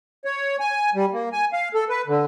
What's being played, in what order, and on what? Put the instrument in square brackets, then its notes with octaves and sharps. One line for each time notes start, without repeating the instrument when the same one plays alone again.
[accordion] C#5
G#5
G3
A#3
G#5
F5
A4
B4
D3